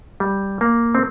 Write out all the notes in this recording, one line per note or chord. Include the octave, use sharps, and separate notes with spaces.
G3
A#3
C4